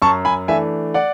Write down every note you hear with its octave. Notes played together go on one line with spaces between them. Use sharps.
F#2 A5 C#6
G#5 B5
E3 A3 D4 E5 G#5
D5 F#5